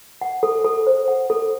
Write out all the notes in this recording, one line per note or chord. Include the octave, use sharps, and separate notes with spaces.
F#5
A4
A4
C5
F#5
A4